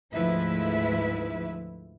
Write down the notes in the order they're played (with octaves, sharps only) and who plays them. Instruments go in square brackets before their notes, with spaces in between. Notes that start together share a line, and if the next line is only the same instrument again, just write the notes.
[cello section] D2 G#2 F3 E4 B4 E5